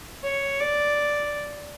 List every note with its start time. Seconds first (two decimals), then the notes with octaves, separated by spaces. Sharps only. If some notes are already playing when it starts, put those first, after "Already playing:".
0.24 C#5
0.60 D5